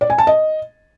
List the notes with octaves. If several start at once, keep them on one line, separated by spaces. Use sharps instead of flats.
D5
G#5
A5
D#5